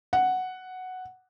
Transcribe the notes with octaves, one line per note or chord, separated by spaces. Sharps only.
F#5